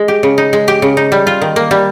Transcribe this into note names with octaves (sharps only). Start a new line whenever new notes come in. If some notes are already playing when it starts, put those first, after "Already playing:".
Already playing: G#3
G4
C#3
D#4
G#3
G4
C#3
D#4
G3
F4
D#3
A#3
G3